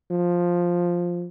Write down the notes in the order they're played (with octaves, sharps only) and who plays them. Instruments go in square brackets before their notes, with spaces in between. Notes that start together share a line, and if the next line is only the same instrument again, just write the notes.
[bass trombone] F3